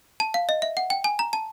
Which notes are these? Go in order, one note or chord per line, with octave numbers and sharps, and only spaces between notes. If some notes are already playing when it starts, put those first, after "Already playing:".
A5
F5
D#5
E5
F#5
G5
G#5
A#5
A5